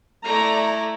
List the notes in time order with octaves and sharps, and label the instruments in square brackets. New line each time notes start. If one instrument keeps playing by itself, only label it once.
[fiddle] A3 E4 [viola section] D5 A#5